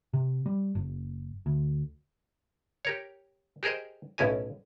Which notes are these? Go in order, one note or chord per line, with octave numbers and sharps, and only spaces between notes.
C3
G3
F#1
D2
G4 A#4 C#5
G4 G#4 A#4 C5 D#5
B1 A2 C#4 E4 A#4 G#5